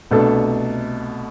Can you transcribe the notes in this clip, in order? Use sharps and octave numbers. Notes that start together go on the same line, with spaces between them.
C2 B2 A3 D4 A4